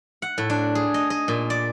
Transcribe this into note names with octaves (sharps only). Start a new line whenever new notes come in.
F#5
A2
D4
G#4
D#5
D#5
A#2
D5